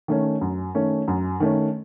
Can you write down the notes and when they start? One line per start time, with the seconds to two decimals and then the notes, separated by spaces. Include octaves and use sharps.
0.08 D#3 A3 C#4
0.41 F#2
0.75 D#3 A3 C#4
1.08 F#2
1.40 D#3 A3 C#4